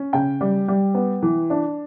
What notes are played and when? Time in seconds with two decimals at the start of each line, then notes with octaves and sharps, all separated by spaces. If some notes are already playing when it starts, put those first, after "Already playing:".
Already playing: C#4
0.13 C#3 G5
0.41 G3
0.68 G3
0.94 B3
1.22 E3
1.50 D4